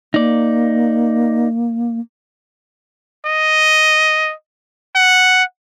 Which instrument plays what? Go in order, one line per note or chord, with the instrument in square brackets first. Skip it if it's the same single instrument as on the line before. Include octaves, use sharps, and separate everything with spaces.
[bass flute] A#3 [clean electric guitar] D#4 D5
[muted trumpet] D#5
F#5